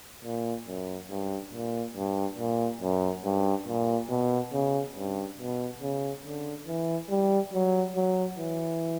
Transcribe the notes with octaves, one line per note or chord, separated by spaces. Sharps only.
A#2
F#2
G2
A#2
G2
A#2
F#2
G2
A#2
B2
C#3
G2
B2
C#3
D3
E3
G3
F#3
F#3
E3